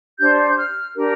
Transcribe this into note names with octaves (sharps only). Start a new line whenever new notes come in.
D4 G4 C5 G6
G6
F6
D4 G4 A#4